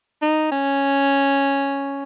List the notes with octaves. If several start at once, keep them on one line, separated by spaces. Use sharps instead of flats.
D#4
C#4